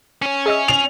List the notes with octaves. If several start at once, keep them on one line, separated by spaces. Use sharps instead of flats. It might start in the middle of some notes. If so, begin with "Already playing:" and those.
C#4 C#5
G#4 D#5 E5
C7 F7